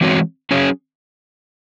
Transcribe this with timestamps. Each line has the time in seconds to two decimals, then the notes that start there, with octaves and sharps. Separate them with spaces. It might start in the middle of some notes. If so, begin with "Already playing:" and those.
0.01 E3 G#3 C4 F#4 C#5
0.51 F#3 C#4 G#4 C#5